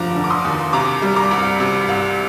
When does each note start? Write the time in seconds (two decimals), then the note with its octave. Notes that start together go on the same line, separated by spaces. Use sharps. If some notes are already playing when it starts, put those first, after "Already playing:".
Already playing: F1 D3 F3 A#5 D6
0.16 D3
0.24 D6
0.30 C6 D#6
0.45 D#2
0.73 C3 A#5 D6
1.02 G3
1.16 A#5 D6
1.31 C2
1.60 C3
1.88 C2